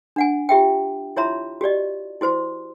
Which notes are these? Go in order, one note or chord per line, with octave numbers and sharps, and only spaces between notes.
D4 F#5 G#5
F4 G4 E5 G5
E4 F4 C#5 E5 A#5 C6
F#4 G4 D5 D#5
E4 F#4 C5 C6